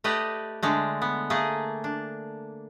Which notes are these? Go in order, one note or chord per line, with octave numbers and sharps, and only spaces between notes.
A3 G4 B4 D5 D#5
D3 G#3 A3
B3
A3 A#3 G#4
D4